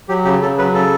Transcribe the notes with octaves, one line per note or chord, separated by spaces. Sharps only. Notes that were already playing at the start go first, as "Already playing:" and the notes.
F#3 G4
C#3 G4
C#3 A4
F#3 B4
C#3 A4